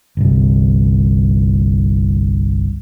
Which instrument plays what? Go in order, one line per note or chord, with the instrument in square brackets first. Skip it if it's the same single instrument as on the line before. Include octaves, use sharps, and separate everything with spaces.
[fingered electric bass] G1 C2